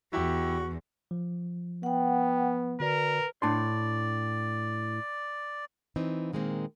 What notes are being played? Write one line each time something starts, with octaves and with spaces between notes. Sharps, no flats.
E2 E4 F#4 G4
F3
B3 F#5 G5
D3 F#4 A#4 B4 D5
A2 D4 D5 C6
E3 C4 D#4
A#2 D#3 G#3 A#3 C4